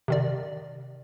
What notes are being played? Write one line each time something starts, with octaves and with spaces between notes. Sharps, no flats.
C3 D#3 D5